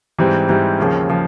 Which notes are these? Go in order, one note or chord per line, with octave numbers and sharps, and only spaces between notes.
G#2 E3 G3 C4
G#2 E3 G3 C4
D#2 C#3 F3
C#3 F3